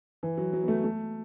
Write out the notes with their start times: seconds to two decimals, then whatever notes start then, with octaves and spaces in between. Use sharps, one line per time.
0.23 E3
0.37 F#3
0.53 F#3
0.63 B3
0.68 A3
0.84 A3